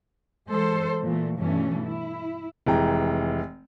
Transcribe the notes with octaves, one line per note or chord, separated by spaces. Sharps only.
E3 G#3 A4 C5
A#2 E3 A3
G2 B2 E3 A3 C#4
E4
F1 E3 G#3 G5 A#5